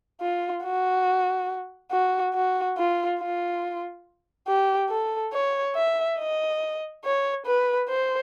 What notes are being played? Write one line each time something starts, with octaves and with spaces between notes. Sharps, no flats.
F4
F#4
F#4
F#4
F4
F4
G4
A4
C#5
E5
D#5
C#5
B4
C5